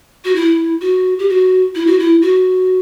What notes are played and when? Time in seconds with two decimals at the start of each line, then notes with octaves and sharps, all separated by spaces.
0.25 F#4
0.35 E4
0.81 F#4
1.19 G4
1.29 F#4
1.75 E4
1.87 F#4
1.99 E4
2.22 F#4